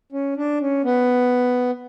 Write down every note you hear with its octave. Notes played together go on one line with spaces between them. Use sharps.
C#4
D4
C#4
B3